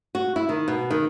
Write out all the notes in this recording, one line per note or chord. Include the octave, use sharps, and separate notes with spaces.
F#4
E4
D#3
B2
D#3